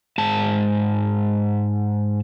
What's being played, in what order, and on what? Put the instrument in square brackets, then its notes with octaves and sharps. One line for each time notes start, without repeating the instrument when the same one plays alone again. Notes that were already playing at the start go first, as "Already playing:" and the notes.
[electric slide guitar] G#2 A5